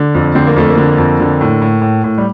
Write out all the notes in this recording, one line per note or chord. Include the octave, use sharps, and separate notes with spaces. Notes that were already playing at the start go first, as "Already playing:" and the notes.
Already playing: D3
F2
D3 C4
A#3
F2 A3
A#3
D3
F2
D3
A2
A2
A2
A2
G3